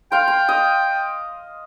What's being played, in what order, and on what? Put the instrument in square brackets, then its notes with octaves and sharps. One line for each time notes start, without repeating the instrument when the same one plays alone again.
[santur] F5 C6 [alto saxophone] G5
[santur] C6
D#5 D#6